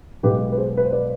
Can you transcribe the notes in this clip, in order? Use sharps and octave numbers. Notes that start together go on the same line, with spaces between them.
B1 B2 G#3 G4 B4
B4
G#4 C5
B4
C5
B4 D5